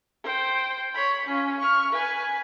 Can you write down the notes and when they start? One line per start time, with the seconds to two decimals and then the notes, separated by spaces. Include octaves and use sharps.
0.24 C5 G5
0.94 C#5 B5
1.26 C#4 F4
1.58 C#6 F6
1.92 B4 G#5